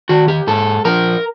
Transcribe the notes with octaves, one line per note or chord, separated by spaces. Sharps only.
D#3 F#4
G4
G#2 A4
F3 A#4